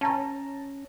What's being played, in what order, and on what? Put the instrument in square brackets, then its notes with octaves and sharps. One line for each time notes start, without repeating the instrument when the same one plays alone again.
[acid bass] C#4 [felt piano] A5 A#5